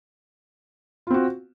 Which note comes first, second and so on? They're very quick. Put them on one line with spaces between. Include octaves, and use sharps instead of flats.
F4 C4 F#4